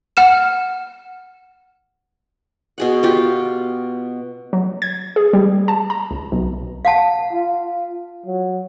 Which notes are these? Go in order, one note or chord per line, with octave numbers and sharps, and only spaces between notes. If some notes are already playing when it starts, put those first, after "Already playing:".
F#5 F6 E7
B2 G#4 F#5
B3 F4 G4
F#3
G#6
G#4
G3
A5
A#5
C#2
B1
F5 F#5 A5
F4
F#3